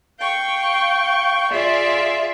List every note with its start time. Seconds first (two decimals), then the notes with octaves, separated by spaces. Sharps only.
0.20 F5 G5 C#6
1.51 F4 G#4 D5 E5